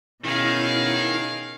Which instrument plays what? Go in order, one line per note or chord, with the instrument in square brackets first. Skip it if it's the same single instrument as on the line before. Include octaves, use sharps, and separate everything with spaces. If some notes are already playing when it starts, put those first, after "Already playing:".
[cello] B2 C#4 [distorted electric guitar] D#3 [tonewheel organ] E4 [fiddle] G#4 F5